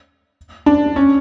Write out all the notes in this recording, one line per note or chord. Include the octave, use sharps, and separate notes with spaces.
D4
C#4